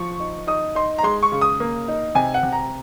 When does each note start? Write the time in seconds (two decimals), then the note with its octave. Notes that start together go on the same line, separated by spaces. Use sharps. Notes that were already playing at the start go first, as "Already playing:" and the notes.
Already playing: F3 C#6
0.20 D#4
0.47 D#4 D#6
0.75 D#4 C6
0.98 A#5
1.03 G#3 C6
1.23 C#6
1.32 C#3
1.41 D#6
1.60 A#3
1.88 D#4
2.15 C3 G#5
2.34 F#5
2.43 C3
2.52 A#5